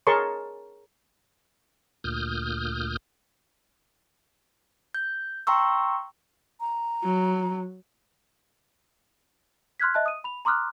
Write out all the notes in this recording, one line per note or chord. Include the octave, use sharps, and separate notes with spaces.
G#4 A#4 C#5 A5 C6 C#6
D2 A#2 D#6 F6 G6
G6
G5 A#5 C6 C#6 E6
A#5
F#3
C6 F6 F#6 G#6 B6
D#5 E5 A5 F#6
D#6 D#7
B5 F7
A#5 C6 D6 D#6 F6 F#6